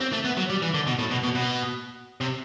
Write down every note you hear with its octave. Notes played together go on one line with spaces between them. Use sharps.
C4
A3
B3
F#3
G3
E3
D3
B2
A2
B2
B2
B2
C3